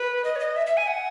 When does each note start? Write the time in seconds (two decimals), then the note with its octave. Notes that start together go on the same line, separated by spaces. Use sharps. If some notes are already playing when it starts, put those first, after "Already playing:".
Already playing: B4
0.24 D#5
0.36 C#5
0.40 D#5
0.56 E5
0.66 E5
0.77 G#5
0.87 F#5